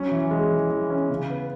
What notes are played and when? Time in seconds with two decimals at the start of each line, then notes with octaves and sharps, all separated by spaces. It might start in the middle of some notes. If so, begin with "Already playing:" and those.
Already playing: F#3 C#4
0.11 E3
0.31 G#3
0.51 E3
0.71 E3
0.90 C#4
1.10 C#3
1.30 B3